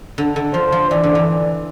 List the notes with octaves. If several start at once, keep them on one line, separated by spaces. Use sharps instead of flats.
D3
D3
F3 C5
F3
E3 D5
D3
E3